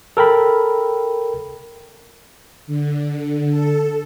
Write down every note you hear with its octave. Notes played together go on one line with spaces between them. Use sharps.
A4 A#4 G5 B5
D3
A4